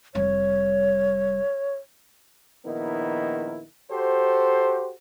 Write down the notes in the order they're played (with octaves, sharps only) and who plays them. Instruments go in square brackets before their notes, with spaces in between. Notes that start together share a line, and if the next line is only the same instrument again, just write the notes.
[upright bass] F1 G3 [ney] C#5
[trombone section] A#1 D#3 B3 D#4 E4 A#4
F#4 G4 A4 C5